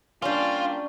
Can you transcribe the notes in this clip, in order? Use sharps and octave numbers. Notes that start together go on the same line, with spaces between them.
G3 A#3 C#4 D4 F4